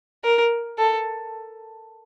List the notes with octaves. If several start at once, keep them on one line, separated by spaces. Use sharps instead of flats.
A#4
A4